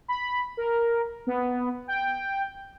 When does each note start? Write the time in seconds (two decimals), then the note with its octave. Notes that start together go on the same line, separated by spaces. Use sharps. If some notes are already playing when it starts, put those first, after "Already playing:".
0.08 B5
0.57 A#4
1.27 B3
1.88 G5